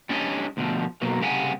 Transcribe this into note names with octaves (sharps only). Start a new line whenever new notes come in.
G3 C#4 D4 C#5 D#5
D2 B2 F3
B2 F#3 A#3
C2 C#3 G4 D#5 F#5 G#5